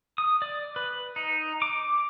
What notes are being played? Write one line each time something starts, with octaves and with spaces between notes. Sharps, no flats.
D#6
D5
B4
D#4
D6